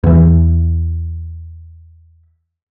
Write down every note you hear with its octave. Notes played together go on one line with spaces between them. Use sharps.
E2 E3